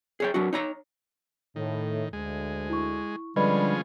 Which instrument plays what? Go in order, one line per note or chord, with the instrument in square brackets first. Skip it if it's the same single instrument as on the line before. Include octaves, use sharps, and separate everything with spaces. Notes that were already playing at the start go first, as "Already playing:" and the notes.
[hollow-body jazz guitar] G#4 C#5 G5
F#3 D4 F#4
D#4 C#5 A#5
[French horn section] A2 [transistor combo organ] D#3
[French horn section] D2 [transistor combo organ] G#3
[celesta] E4 C#6
[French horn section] D3 [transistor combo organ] F3 G#3 C#4 [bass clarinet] G3 [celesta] B4 D#5 B5